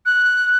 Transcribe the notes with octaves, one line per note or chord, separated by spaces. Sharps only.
F#6